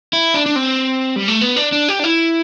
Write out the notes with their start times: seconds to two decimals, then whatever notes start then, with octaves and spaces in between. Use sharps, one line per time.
0.13 E4
0.34 D4
0.46 D4
0.56 C4
1.16 G3
1.28 A3
1.41 B3
1.56 D4
1.72 D4
1.89 G4
2.00 D4
2.04 E4